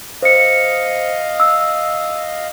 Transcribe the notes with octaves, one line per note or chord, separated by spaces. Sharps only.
C5 D#5 F5 C#7
E6